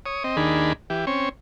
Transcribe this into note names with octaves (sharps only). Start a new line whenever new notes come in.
C#5 D#6
C4 D#5
D#2 D#3 D4 G#4 B5
E3 G4
C4 C#4 C#5